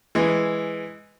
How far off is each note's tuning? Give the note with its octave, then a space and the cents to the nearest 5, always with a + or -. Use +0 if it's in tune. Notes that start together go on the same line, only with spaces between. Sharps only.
E3 +0 G#3 +0